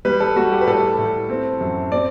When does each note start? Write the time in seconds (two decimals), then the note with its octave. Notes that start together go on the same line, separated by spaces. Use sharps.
0.05 G3 B4
0.20 A4
0.36 G3 F#4
0.52 G4
0.61 B4
0.67 A2 A4
0.98 A2
1.30 C4
1.61 F#2
1.92 C4 D5